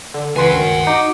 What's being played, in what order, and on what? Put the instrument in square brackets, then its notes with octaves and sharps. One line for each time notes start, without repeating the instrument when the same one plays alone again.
[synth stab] D3
[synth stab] C#2 C6 [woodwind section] E3 B4 [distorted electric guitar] F#5 G#5
[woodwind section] D2 G2 D#3
[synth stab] D#4 [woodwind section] F#4 D6